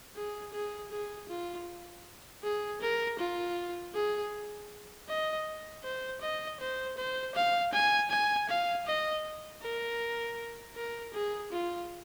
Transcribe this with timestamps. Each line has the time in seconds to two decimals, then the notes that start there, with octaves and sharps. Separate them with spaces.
0.16 G#4
0.53 G#4
0.92 G#4
1.29 F4
2.43 G#4
2.82 A#4
3.19 F4
3.95 G#4
5.09 D#5
5.84 C5
6.21 D#5
6.60 C5
6.97 C5
7.35 F5
7.73 G#5
8.10 G#5
8.49 F5
8.87 D#5
9.62 A#4
10.76 A#4
11.13 G#4
11.52 F4